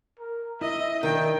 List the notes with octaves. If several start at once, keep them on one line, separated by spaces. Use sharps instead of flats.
A#4
E4 D#5 E5
D#3 D4 D#4 A#4 G5